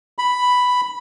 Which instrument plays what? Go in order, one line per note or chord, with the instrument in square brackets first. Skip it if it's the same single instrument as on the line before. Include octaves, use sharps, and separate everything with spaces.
[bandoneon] B5